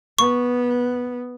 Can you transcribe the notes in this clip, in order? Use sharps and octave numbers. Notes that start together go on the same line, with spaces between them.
B3 C#6